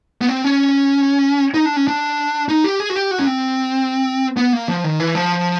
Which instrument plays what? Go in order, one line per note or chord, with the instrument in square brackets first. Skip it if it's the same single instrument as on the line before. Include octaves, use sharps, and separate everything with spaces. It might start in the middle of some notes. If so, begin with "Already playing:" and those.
[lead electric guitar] B3
C4
C#4
D#4
D4
C#4
D4
D#4
G4
G#4
F#4
G4
F#4
C#4
C4
B3
A#3
F3
D#3
E3
F3